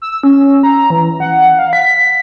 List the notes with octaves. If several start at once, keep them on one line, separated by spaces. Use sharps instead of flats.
E6
C#4
A#5
E3
F#5
F5
B6